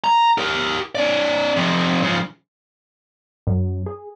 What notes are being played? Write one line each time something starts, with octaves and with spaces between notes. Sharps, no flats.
A#5
G4 A#4
C#4 D5
F2 C3
C#3 F3
F#2
G#4